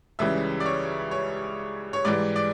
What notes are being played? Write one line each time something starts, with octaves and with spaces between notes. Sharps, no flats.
C#2 C#3 E3 G3 E5
D5
C#5
C#5
C#5
G#2 E3 G3 D5
D5